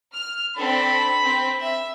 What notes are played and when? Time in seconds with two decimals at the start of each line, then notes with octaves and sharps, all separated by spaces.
0.14 F6
0.57 C4 D4 A4 B5
1.22 C4
1.61 E5